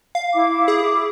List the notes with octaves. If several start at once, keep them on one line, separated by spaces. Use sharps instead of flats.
F5
E4 D6
G#4